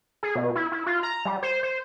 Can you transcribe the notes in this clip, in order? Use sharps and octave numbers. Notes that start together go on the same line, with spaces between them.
G#4
B2
E4
E4
F4
A#5
G3
C5
C5